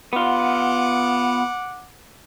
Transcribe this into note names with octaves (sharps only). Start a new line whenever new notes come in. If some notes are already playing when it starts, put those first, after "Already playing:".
B3 F4 F#5 D6